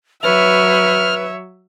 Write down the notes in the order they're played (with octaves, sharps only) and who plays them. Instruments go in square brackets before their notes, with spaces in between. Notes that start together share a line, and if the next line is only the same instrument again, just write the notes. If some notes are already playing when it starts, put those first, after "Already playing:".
[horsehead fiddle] F#3 C#5 [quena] B4 [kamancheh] E5 [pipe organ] F6